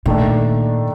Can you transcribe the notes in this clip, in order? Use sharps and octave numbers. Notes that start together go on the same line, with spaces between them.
A#2 D#3 A3 D4